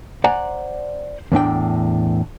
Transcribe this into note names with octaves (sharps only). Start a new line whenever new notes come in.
C5 D5 F#5 G#5 A#5
E2 A2 D4 G5